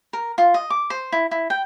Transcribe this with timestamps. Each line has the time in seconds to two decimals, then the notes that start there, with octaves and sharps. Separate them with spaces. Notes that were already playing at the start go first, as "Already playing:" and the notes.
0.13 A#4
0.38 F4
0.54 D#5
0.70 D6
0.90 C5
1.12 E4
1.31 E4
1.50 G5